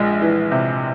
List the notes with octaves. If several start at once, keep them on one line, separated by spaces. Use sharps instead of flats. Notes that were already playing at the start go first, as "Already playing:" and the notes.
Already playing: A#1 G#3
E3
C3